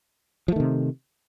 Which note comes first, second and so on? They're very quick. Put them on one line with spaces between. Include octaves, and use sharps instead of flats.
F3 A3 D#3 C3